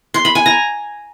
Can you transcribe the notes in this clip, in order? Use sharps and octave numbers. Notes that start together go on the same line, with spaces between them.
C6
B5
G#5
A#5